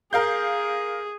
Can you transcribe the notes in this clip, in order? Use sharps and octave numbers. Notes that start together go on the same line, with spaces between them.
G#4 A#4 F5 G6